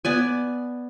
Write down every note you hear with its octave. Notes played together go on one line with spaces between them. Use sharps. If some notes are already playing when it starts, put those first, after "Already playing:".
B3 D5 G#5